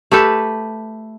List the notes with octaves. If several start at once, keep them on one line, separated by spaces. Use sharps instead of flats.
A3 G4 A4 B4